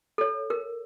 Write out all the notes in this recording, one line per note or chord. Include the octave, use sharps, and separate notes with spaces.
A4 C#5
A#4